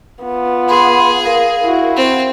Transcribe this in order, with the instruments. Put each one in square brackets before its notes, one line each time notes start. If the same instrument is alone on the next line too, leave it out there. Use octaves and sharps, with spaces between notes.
[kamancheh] B3 F4
[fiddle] G#4 [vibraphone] B5 C6
[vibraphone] A#4 F5
[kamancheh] E4 F#4
[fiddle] C4